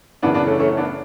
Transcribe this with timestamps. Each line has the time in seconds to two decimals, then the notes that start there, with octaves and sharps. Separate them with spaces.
0.22 F#2 C#3 E3 B3 D4
0.34 B3 D4
0.47 A3 C#4
0.60 A3 C#4
0.77 B3 D4